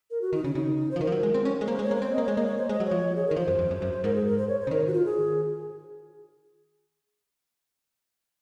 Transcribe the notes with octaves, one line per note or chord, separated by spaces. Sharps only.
A#4
F#4
D#3 D#4
C#3 C#4
C#3 D#4
F3 C5
D#3 A#4
F3
F#3
G#3
C4
C#4
G#3
A#3 C5
G#3
C#5
A#3
C#5
C4 C5
A#3 D#5
G#3 C#5
A#3 D#5
C#5
C5
G#3 D#5
F#3
C#5
F3
G#4
D#3 A#4
F3 C5
F#2
F2
F#2
F#2
G#2 A#4
G#4
A#4
C5
C#5
C5
C#3
D#3 A#4
F#4
F4
G#4